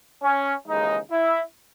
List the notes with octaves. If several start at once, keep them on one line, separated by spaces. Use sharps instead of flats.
C#4
D#2 C#3 E3 G#3 D#4
E4